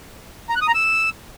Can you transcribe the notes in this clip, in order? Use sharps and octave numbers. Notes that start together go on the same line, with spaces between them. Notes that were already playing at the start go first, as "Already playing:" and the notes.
A#5
F#6
D#6
A#5
E6